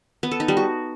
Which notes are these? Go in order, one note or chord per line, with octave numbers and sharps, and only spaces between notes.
B3
A4
D#4
G3
F#4